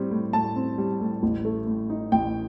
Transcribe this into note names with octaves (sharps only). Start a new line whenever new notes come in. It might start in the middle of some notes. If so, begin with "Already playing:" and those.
Already playing: A2 G3 C4
A2
A2 A5
C4
G3
A2
A1
A3
A2
D#4
A1 G5